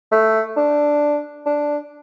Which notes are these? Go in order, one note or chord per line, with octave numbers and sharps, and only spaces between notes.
A3
D4
D4